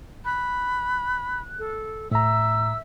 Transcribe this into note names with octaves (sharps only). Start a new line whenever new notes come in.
B5 F#6
A4
A2 E5 A#5 E6